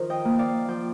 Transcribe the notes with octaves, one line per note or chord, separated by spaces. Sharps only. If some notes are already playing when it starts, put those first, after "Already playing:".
Already playing: D#3 F3 A#4 C5
D#5 G5
A#3
D5 F5
F3 G5